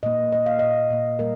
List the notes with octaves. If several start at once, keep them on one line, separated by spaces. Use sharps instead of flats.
A#2 A#3 D#5
A#2 A#3 D#5
F5
A#2 A#3 D#5
A#2 A#3
A#2 G3 A#3 A#4